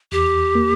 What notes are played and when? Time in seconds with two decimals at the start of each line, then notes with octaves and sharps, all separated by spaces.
0.12 E2 G4
0.55 A#3